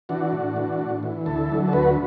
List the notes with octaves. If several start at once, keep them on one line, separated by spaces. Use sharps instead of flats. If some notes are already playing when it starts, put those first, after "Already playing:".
E3 D4 F#4
A2
E3
A2
E3
D2 E4 A4
D3 F#3
A4
D2 F#4 B4